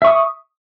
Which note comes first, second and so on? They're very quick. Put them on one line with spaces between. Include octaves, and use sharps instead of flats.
E5 C#6 D#6